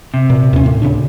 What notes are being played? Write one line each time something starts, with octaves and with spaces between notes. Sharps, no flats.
C3
A#2
D#2 C#4
A2
D2 C#3 D4